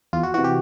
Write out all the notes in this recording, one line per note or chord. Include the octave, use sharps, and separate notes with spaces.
E2 F4
F#4
C3 E3 F#4
G4